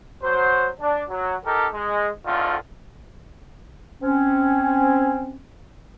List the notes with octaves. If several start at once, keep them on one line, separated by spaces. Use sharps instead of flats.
F#3 C5
D4
F#3
D#3 G4 A4 A#4
G#3
G#1 C#2 A2 D3 D#3 F4
C4 C#4